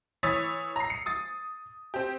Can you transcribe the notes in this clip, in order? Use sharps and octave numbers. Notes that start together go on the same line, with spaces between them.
E3 C#5 D#6 E6 A6 B6
A#5 C7
C#7
D#6 A6
C4 G4